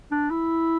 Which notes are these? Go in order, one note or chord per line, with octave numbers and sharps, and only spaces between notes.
D4
E4